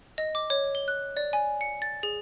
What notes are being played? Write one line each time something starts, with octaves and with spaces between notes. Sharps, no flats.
D#5
D6
C#5
G7
F#6
D5
G#5
C#7
A6
G#4